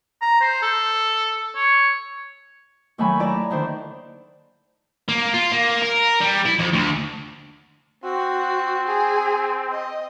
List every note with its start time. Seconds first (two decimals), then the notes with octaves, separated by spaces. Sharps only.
0.21 A#5
0.41 C5
0.62 A4
1.56 C#5
2.98 D#2 D#3 F#3 A3 G#5 B5
3.20 E4 D5 A5 A#5
3.50 D3 D#3 C5
5.09 A#3
5.34 F4
5.52 A#3
5.83 A#4
6.21 G3
6.46 E4
6.59 F2
6.73 D2
8.04 C4 F#4
8.87 G#4
9.72 D#5